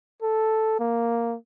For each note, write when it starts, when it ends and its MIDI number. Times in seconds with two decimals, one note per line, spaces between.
0.22 0.77 69
0.80 1.36 58